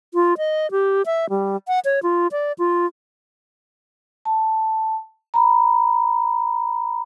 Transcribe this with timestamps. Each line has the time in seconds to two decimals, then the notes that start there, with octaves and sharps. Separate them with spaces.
0.14 F4
0.38 D#5
0.71 G4
1.06 E5
1.30 G3
1.68 F#5
1.85 C#5
2.03 F4
2.32 D5
2.58 F4
4.25 A5
5.34 A#5 B5